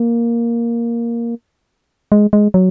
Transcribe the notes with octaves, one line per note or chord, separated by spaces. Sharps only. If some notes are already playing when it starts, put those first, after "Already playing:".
Already playing: A#3
G#3
G#3
F#3